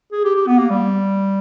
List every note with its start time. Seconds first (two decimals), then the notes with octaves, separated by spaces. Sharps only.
0.12 G#4
0.24 G4
0.35 G4
0.47 B3
0.58 A#3
0.70 G3